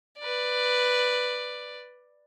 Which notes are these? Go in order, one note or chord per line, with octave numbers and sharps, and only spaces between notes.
B4 D5